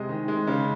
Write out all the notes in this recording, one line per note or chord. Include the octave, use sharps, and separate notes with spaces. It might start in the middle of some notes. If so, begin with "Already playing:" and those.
Already playing: C3 G#3 D#5
D#3
G#3
C#3